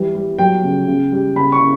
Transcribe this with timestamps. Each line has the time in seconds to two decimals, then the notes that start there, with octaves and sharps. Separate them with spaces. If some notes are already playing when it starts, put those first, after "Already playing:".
Already playing: E3 G3
0.15 G3
0.38 F#3 G5
0.63 C#3
0.87 C#3
1.12 G3
1.36 C#3 B5
1.52 C#6
1.60 C#3